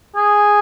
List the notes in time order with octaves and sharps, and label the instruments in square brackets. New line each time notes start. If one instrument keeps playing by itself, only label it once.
[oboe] G#4